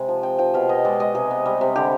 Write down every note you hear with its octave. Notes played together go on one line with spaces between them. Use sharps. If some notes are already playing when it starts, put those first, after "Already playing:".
Already playing: C3 G#3 B5
F3
C4 G5
F3 G5
B2 F5
B2 D#5
G#3 D5
G#3 D#5
C3 G#4
B3
G3
C3
D3 G4